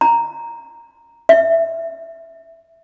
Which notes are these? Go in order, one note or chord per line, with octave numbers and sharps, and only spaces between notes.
A#5
E5